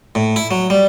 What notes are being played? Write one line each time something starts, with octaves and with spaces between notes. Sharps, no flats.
A2
E4
F#3
G3